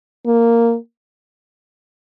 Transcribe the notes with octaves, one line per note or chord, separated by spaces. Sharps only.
A#3